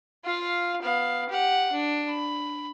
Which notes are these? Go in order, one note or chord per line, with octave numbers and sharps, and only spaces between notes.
F4 F5
B3 F5
G4 F#5
D4
B5